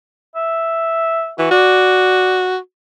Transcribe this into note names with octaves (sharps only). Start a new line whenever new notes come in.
E5
E3 F#4
F#4 D5